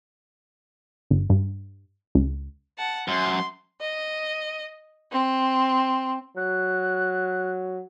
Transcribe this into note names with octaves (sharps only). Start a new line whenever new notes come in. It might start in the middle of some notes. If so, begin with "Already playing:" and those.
G1
G2
C#2
F#5 A5
F#2 C6
D#5
C4
F#3 F#6